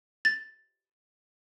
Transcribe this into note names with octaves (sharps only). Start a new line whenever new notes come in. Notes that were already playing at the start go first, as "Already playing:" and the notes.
A6